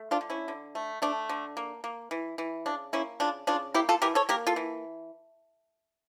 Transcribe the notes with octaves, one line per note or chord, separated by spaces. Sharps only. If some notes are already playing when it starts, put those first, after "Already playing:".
Already playing: A3
D4 F4
D3
C#4 E4
D3
A3
A3 D4
D3
A#3
A#3
E3
E3
C#3 D4
A#3 C#4 E4
C#3 D4 F4
C#3 D4 F4
A#3 E4 G4
F4 A4
E3 G4 A#4
A4 C#5
A#3 G4 A#4
F4 A4
E3